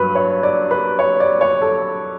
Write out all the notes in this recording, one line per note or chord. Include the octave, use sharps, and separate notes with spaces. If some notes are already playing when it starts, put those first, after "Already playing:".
Already playing: G2 F#3 B4
C#5
D5
B4
C#5
D5
C#5
A4